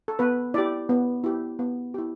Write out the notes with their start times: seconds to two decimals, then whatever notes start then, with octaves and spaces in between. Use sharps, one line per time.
0.08 A4
0.19 B3 B4
0.54 E4 G4 D5
0.89 B3
1.24 E4 G4
1.59 B3
1.94 E4 G4